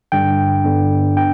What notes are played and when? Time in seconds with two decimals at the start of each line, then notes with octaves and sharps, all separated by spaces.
0.12 G2 D3 G3 D4 G5
0.64 G2 D3 B3 D4
1.16 B3 D4 G5